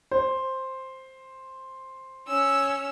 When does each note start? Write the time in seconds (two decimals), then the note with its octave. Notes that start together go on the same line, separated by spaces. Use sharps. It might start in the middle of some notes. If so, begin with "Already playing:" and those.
0.11 C5
2.27 C#4 E6